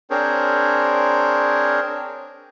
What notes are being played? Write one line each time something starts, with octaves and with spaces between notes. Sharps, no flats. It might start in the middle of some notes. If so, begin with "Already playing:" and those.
C4 D4 G#4 A#4 C5 C#5